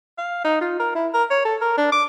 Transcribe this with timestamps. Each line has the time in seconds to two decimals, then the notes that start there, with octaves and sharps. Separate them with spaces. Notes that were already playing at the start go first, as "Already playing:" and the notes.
0.18 F5
0.44 D#4
0.61 F4
0.79 A#4
0.95 E4
1.14 A#4
1.31 C#5
1.45 A4
1.61 A#4
1.77 D4
1.92 D6